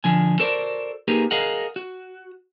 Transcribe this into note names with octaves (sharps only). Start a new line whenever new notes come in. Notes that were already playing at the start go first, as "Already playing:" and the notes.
D3 F3 G#5
F#4 A4 A#4 C5 D5
A#3 D#4 G4 G#4 A#4 B4
G#4 A#4 D#5 F5 F#5
F#4